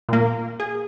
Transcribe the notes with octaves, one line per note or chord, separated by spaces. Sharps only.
A#2 A#3
G#4